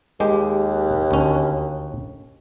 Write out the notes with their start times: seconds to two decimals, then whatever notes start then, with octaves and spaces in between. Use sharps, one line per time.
0.20 D#2 G#3 G4
1.11 D2 C#4